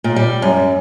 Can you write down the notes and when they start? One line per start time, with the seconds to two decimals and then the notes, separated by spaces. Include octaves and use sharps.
0.04 A#2
0.16 G3
0.42 F#2